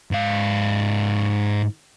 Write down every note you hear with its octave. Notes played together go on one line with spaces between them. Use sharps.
G#2 F5